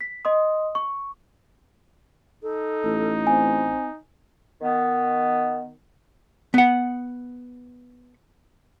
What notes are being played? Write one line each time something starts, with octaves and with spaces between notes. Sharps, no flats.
B6
D#5 C6 D#6
C#6
D#4 A4
A1
C4 G#5
D#3 B3
B3 F#5